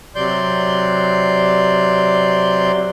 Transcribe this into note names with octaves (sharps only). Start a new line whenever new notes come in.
C3 F#3 D5 C6 G6